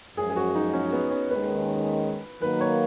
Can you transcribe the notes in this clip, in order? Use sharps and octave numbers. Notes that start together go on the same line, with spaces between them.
F#2 F3 G#3 G#4
G#4
F#4
D#4
C#4
B3
C#4
D#2 D#3 G#3 C#4 B4
D#3 F#3 A#3 B4
C#5